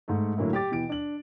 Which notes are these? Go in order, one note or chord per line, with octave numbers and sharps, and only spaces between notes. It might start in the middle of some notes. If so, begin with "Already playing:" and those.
G#2 A3
A2 D3 F#3 A#3 E4
G4 D6 A6
B2 E3 G5 D7
D4 F#7